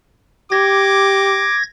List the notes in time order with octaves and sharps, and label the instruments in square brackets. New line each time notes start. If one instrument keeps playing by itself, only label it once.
[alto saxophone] G4 [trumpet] D6 [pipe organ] G#6 A#6